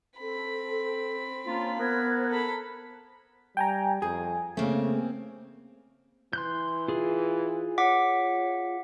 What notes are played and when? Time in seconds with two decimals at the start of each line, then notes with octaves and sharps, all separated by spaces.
0.19 C4 A4 B5
1.46 A#3 C#4 D4 F4
1.79 B3 A#4 C5 F#6 G#6
2.30 A4 A#5 B5
3.57 G3 G5 G#5 A#5
4.02 F2 G#4 G#5
4.57 C#3 A3 A#3 C4
6.33 E3 C6 F#6 G6
6.88 F4 G#4
7.78 C#5 F#5 D6 B6